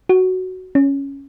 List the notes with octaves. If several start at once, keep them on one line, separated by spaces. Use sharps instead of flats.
F#4
C#4